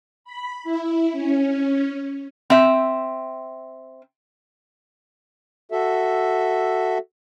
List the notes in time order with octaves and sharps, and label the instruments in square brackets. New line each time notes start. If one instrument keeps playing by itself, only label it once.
[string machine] B5
E4
C#4
[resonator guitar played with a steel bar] C4 E5
[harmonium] F#4 A4 E5